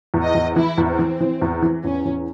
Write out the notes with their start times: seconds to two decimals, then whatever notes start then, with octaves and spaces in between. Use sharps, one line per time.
0.14 E2
0.24 D#5
0.35 E2
0.56 E3 E4
0.78 E2
0.89 C4
0.99 E3
1.20 E3
1.42 E2
1.62 E3
1.84 E2 C#4
2.05 E2